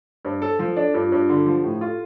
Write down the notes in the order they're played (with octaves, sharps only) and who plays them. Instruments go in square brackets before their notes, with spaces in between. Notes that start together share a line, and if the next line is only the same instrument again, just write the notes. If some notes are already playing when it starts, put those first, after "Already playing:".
[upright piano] G2 [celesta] C5
[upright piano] A4
[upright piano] F3 [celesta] A4
[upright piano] D4 [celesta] A4
[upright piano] G2 [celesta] F4
[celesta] F4
[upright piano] G2
[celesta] G4
[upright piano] D3 [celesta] A4
[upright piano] F3 [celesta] G4
[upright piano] A2 [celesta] G4
[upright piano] F4 [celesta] A4